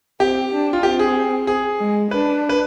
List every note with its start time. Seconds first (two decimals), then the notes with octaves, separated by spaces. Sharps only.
0.20 C4 G4
0.51 D4
0.73 F4
0.83 C4 G4
0.99 G#4
1.47 G#4
1.79 G#3
2.11 D4 B4
2.49 B4